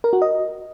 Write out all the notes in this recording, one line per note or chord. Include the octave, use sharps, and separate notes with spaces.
A#4
F#4
D#5